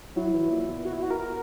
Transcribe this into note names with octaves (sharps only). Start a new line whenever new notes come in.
F#3 E4
E3
A#2
B2
F#4
E4
F#4
A#4